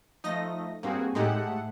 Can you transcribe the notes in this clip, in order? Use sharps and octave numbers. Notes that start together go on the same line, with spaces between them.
F3 A3 D#4 D#5 A#6
G2 A#3 C4 F#4 G#4
A2 G#3 D#4 G4 A4 F#5